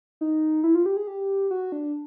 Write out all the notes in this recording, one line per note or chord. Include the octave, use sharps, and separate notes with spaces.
D#4
E4
F4
G4
G#4
G4
F#4
D4